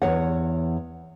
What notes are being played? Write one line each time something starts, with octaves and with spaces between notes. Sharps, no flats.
E2 C#5 F#5